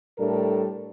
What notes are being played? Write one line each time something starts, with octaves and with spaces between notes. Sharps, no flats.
A2 G3 D4 A4 A#4